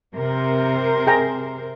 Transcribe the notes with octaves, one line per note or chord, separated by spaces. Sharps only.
C3 A#4 C5
G#4 G5 A#5